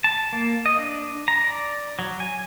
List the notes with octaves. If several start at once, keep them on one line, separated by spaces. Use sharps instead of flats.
A5
A#3
D#5
D4
A#5
D5
F#3
G#5